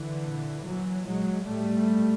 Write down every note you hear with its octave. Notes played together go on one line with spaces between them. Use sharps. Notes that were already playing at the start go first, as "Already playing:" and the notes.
Already playing: D3 E3
A#2
A#2 E3 F#3
A#2 F#3 G#3
A2 G3 A3
A#2